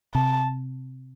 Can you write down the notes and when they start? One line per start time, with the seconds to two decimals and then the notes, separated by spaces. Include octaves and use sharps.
0.14 C3 A5